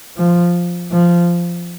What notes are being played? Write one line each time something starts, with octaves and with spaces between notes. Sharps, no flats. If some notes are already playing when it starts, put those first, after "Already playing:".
F3
F3